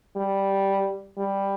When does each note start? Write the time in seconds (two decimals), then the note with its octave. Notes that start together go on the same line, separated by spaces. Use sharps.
0.16 G3
1.17 G3